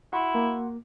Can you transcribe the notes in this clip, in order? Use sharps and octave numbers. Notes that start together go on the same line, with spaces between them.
E4 F#4 F#5 C6
A#3